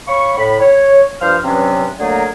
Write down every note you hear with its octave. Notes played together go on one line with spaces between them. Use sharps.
C#5 F5 B5 C#6
A2 B5
C#5
G2 F3 C5 F6
G2 C3 E3 F#3 B3 C#4
D3 F#3 A3 A#3 G#4 A#4